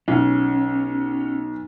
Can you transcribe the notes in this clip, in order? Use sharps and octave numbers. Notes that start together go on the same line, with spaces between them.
B1 C#4